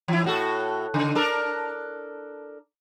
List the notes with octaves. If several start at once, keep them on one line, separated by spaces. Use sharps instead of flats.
E3 E4
A2 F#4 A4
C#3
D4 A4 A#4